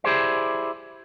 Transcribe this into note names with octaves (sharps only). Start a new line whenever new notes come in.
E4 G4 G#4 C5 D5